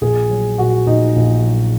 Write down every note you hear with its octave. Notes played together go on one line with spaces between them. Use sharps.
A#1 G#4
F#3
A#2 F#4
A#1 D#4
A#1
F#3